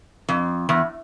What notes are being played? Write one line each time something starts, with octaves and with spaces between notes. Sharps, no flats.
F2
E2